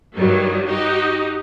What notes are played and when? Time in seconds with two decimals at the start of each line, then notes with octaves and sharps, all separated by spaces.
0.16 G2 D#3 F#3 G3
0.68 D#4 F#4 G4